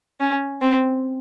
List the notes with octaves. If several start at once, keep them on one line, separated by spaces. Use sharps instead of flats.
C#4
C4